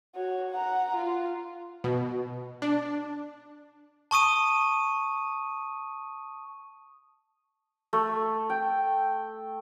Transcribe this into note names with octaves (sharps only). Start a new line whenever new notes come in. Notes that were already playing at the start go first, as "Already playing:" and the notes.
F#4 C#5
F#5 A#5
F4
B2
D4
A5 C#6 D#6 D#7
A3
G5